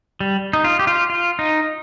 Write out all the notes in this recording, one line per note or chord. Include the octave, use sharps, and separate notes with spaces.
G3
D#4
F4
G4
F4
F4
D#4